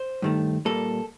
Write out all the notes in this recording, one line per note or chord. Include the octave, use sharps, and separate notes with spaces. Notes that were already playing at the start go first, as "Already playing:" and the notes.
Already playing: C5
G2 D#3 A3
A#2 G3 A#3 A4